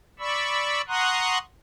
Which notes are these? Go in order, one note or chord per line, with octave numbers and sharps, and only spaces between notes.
D5 B5 C#6 E6
F#5 A#5 C6 C#6 D#6 F#6